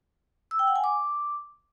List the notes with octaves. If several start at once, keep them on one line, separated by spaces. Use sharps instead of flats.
E6
G5
F#5
G#5
D6